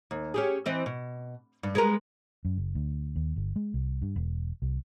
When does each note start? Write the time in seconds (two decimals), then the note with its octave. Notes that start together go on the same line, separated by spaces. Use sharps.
0.11 D#2
0.34 C#4 G4 G#4
0.66 E3 C4 D#5
0.86 B2
1.63 G2
1.75 G#3 B3 A#4
2.45 F#2
2.58 F#1
2.75 D2
3.16 D#2
3.36 G1
3.56 G#3
3.74 C2
4.02 G2
4.16 E1
4.62 C2